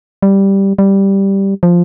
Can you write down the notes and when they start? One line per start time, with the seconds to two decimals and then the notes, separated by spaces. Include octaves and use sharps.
0.22 G3
0.79 G3
1.63 F3